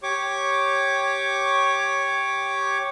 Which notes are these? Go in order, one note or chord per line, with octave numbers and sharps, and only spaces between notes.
G4 C#5 C#6 D6